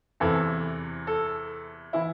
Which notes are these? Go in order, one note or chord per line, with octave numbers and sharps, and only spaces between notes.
E2 C3 E3 A4
A4
E3 E4